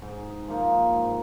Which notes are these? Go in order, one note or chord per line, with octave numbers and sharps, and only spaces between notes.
G#2
F3 A#3 D#4
G#2